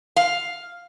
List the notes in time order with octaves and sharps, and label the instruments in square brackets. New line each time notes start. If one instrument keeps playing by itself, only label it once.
[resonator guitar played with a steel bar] F5